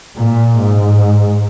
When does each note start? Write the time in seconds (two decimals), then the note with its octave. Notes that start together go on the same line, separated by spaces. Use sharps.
0.16 A#2
0.57 G#2